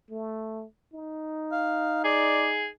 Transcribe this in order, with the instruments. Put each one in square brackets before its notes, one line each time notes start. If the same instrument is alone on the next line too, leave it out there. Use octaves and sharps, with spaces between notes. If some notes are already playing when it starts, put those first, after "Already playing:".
[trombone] A3
D#4
[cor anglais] F5
[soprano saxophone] G#4 [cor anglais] D5